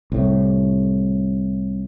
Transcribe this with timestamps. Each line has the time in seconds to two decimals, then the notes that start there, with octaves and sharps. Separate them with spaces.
0.12 C2 A2